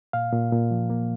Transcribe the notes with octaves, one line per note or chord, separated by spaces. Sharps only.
A#2 F5
A#2
A#2
F3
A#3